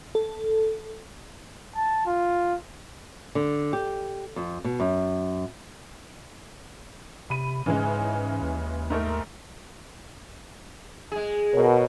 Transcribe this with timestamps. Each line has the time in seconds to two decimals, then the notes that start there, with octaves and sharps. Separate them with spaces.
0.15 A4
1.75 A5
2.06 F4
3.35 D3
3.73 G4
4.36 F2
4.64 B2
4.80 F#2
7.30 C3 B5 D#7
7.66 G#2 C#3 E3 G#3
8.42 D#2
8.90 G#2 A3 A#4
11.12 G#3 G#4
11.53 B2 A#4 C#5